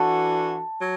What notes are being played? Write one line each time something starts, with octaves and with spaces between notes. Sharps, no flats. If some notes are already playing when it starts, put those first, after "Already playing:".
Already playing: E3 D4 F#4 A4 A5
F#3